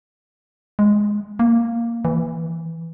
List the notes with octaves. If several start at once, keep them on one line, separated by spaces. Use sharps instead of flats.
G#3
A#3
E3